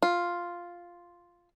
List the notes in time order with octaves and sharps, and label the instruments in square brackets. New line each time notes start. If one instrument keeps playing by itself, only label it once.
[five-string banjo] F4